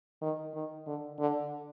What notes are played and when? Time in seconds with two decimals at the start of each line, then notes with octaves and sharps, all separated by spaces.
0.22 D#3
0.54 D#3
0.87 D3
1.20 D3